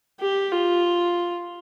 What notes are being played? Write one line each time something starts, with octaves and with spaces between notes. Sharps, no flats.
G4
F4